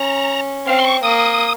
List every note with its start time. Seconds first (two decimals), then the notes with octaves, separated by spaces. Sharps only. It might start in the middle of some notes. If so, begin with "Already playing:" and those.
Already playing: C#4 A#5
0.67 C4 F5
0.79 C6
0.85 C#6
1.03 A#3 D#6